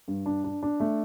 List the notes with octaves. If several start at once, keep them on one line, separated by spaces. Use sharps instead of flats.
G2
D4
D4
D4
A3